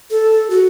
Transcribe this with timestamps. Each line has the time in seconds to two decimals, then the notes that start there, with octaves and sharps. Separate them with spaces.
0.10 A4
0.50 F#4